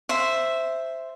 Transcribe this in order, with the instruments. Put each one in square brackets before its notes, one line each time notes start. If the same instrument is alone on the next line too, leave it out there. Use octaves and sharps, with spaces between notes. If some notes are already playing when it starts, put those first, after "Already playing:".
[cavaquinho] C5 E5